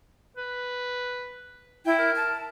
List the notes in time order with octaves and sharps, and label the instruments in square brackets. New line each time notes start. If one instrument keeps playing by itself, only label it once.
[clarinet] B4
[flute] E4 [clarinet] G5
[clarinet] A#4
[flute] A5